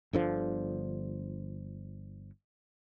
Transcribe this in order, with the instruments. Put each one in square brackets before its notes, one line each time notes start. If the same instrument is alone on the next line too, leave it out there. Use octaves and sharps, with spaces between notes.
[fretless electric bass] G1 D3 F3